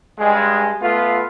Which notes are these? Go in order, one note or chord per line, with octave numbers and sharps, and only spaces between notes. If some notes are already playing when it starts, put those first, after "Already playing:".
G2 G#3
A3 B3 F4